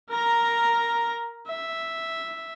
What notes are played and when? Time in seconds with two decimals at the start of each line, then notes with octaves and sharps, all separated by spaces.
0.10 A#4 A#5
1.48 E5